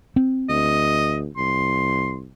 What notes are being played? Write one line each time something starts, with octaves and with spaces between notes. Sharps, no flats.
C4
D2 D#5
C2 C6